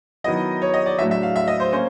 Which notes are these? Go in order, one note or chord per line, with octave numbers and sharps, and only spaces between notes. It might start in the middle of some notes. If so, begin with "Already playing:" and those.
D#3 F#3 B3 E4 D#5
C#5
D#5
D5
A2 F#3 A3 D4 E5
E5
F5
E5
D#5
C5
A#3 C#4 C5